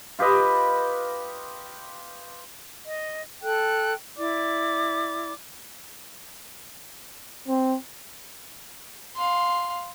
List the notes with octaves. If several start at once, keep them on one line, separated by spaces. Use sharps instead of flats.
F4 G4 B4 D#5
D#5
A4 G5 F#6
E4 D5 D6
C4
F5 C6